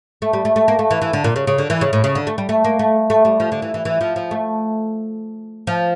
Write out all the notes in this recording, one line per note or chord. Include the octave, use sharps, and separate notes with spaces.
A3
G3
A3
A3
A#3
A3
E3
E3
D3
A#2
C#3
C#3
D3
E3
C#3
A2
C#3
D3
A3
G3
A3
A#3
A3
A3
G3
F3
D3
E3
E3
E3
F3
F3
A3
F3